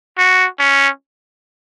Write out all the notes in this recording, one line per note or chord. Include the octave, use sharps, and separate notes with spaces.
F#4
C#4